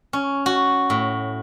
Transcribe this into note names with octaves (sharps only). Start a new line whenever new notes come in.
C#4
F#4
A2